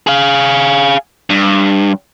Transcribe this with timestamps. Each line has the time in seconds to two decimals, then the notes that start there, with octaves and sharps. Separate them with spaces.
0.07 G#4 F5
1.30 G2